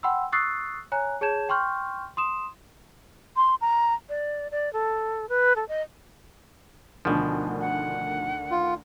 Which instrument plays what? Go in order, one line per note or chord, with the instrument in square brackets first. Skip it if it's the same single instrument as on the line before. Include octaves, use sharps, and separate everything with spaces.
[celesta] F#5 G5 B5 C6 E6
C#6 D#6 E6 F#6 A6 C7
C#5 G#5 A#5 F#6
G#4 C#5 A5 G6 G#6 E7
G5 C6 C#6 F6 G6
C6 D#6 E7
[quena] C6
A#5
D5
D5
A4
B4
A4
D#5
[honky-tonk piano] D2 D3 D#3 [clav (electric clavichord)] B2 F3
[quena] F#5
[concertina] F4